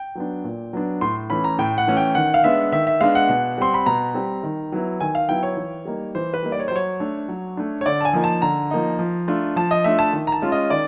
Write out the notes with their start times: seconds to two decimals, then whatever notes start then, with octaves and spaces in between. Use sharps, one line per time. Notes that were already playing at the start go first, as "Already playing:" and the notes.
Already playing: G5
0.15 F#3 B3 D4
0.44 A#2
0.73 F#3 B3 D4
1.01 A2 C6
1.30 E3 A3 C#4 B5
1.44 A#5
1.59 A2 G5
1.78 F#5
1.88 E3 A3 C#4
1.97 G5
2.15 D#3 F#5
2.34 F5
2.44 G#3 B3 D4 E5
2.72 D#3 E5
2.87 E5
3.01 G#3 B3 D4 F5
3.15 F#5
3.29 B2
3.58 G3 C4 C6
3.74 B5
3.86 B2 A#5
4.14 G3 C4
4.43 D#3
4.72 F#3 B3 E4
5.00 D#3 G#5
5.15 F5
5.29 F#3 B3 E4 G5
5.43 C#5
5.57 E3
5.85 G3 A#3 D#4
6.15 E3 C5
6.34 B4
6.42 G3 A#3 D#4
6.52 D5
6.60 C#5
6.68 C5
6.71 F#3 C#5
7.00 A3 D4
7.28 F#3
7.57 A3 D4
7.81 C#5
7.86 D3 D5
8.01 A5
8.05 G#5
8.13 F3 A#3 D#4
8.24 A5
8.42 D3 A#5
8.71 F3 A#3 D#4
8.99 F3
9.28 A3 D4 F4
9.56 F3 A5
9.71 D#5
9.84 A3 D4 F4 E5
9.99 A5
10.13 D#3
10.27 A#5
10.32 A5
10.42 G#3 C#4 F4
10.52 D#5
10.70 D#3 D5